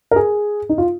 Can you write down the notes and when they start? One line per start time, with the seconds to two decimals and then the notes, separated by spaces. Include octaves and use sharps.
0.11 A#4
0.16 G#4
0.69 D#4
0.78 F4